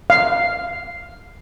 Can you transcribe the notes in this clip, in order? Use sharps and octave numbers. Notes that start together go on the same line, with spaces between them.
F5